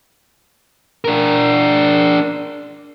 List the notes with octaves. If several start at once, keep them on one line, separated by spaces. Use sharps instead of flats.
D4 A#4